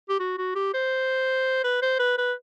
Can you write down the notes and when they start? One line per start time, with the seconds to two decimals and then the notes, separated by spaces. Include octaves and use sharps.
0.09 G4
0.20 F#4
0.38 F#4
0.55 G4
0.74 C5
1.64 B4
1.82 C5
1.99 B4
2.18 B4